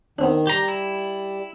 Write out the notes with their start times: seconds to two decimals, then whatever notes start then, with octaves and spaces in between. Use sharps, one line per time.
0.19 D#3 B3 C4 D4
0.47 G3 G4 A#5
0.68 E4